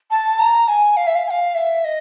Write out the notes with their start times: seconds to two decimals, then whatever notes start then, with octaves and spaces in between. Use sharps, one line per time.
0.11 A5
0.39 A#5
0.68 G#5
0.97 F5
1.07 E5
1.15 F5
1.27 G#5
1.30 F5
1.55 E5
1.84 D#5